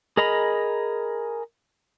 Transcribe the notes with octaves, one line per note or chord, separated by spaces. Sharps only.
G#4 A#4 D#5 A#5 B5